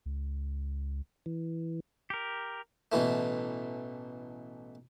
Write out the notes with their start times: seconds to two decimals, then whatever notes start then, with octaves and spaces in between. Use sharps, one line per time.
0.06 C#2
1.26 E3
2.10 G4 A#4
2.92 A1 B2 E3 A3